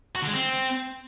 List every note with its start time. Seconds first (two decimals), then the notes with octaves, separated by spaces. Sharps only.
0.16 F#4
0.22 D3
0.27 G#3
0.33 C4